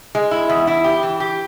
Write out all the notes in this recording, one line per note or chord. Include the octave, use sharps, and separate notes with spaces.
G#3
E4
E2
E4
G4
E3
G4